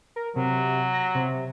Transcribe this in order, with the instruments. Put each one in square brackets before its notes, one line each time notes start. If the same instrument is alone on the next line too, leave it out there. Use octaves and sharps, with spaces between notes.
[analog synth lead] A#4
[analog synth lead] C3 [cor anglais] F#3
[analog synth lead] A#6
C3